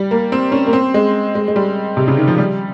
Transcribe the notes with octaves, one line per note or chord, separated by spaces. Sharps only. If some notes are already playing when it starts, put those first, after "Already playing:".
Already playing: G3
A#3
C4
C#4
A#3
C4
G#3
G#3
G#3
G3
C3
C#3
D#3
F3
G3